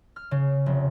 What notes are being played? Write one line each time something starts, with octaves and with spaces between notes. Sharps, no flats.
F6
C#3
F1